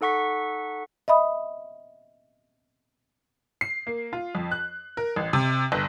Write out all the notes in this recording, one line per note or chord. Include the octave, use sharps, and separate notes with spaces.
D#4 A4 F#5 C#6 B6
D#5 E5 B5 D#6
C7
A#3
F4
F2
F#6
A#4
A1
C3
G1